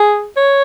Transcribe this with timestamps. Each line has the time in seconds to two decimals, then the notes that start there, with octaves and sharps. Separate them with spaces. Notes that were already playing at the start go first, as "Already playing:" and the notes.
Already playing: G#4
0.37 C#5